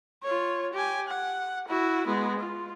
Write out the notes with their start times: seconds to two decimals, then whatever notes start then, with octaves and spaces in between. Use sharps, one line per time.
0.23 F4 C#5
0.73 G4 G#5
1.08 F#5
1.68 E4 F#4
2.06 G#3 B3
2.39 F4